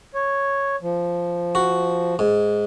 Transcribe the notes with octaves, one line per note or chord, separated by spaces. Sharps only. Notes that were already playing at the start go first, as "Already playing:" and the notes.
C#5
F3
F#4
G#2